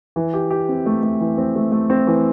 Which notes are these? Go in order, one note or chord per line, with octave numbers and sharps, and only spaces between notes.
E3
G4
G4
C4
A3
A3
E3
C4
A3
A3
C4
E3